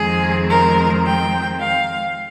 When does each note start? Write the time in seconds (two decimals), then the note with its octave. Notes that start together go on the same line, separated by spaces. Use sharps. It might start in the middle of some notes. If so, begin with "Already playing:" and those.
Already playing: F2 D#3 G#3 C4 G#4
0.48 A#4
1.04 G5
1.59 F5